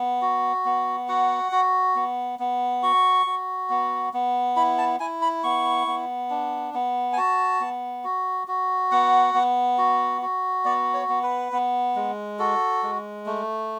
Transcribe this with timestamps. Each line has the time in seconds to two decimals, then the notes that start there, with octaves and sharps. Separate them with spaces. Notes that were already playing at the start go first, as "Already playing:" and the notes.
Already playing: B3
0.22 F#4
0.65 B3
1.08 F#4 F#5
1.52 F#4
1.95 B3
2.39 B3
2.83 F#4 C#6
3.26 F#4
3.69 B3
4.13 B3
4.56 E4 B5
4.78 A5
5.00 E4 G#5
5.22 B5
5.43 B3 C#6
5.87 B3
6.30 D4
6.74 B3
7.13 G#5
7.17 F#4 A5
7.60 B3
8.04 F#4
8.48 F#4
8.91 B3 F#5
9.34 B3
9.78 F#4
10.22 F#4
10.65 B3 D5
10.94 C#5
11.09 B3
11.23 B4
11.52 B3
11.95 G#3
12.39 F#4 A4
12.83 G#3
13.26 A3